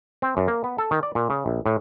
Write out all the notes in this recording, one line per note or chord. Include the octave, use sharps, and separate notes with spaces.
C4
F#2
A#3
B3
A4
D#3
D5
A#2
C#3
A#1
A2